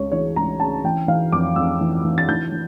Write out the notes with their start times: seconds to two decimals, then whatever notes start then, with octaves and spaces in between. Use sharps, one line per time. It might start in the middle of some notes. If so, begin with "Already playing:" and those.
Already playing: C#2 C#3 C#5
0.12 E3 C#5
0.36 C#2 A#5
0.60 C#3 A5
0.84 E3 G5
1.08 E3 F5
1.32 F2 D6
1.56 F2 E6
1.81 E3
2.05 E3
2.18 A6
2.28 E3 G6
2.52 E3